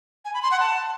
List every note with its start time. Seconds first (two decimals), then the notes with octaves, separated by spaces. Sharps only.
0.25 G#5
0.34 B5
0.42 C6
0.51 F#5
0.60 A5